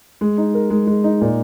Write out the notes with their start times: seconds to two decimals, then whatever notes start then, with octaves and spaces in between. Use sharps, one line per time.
0.21 G#3
0.38 D#4
0.54 A#4
0.70 G#3
0.87 G#3
1.04 D#4
1.21 A#2